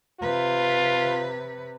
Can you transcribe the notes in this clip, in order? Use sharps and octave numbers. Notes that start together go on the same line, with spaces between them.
C3 F4 B4